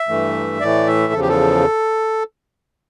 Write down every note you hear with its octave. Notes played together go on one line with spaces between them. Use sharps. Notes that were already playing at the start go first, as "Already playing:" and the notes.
Already playing: E5
G2 E3 A3
A2 E3 A3 D5
E5
E2 C#3 F3 A4
G4
A4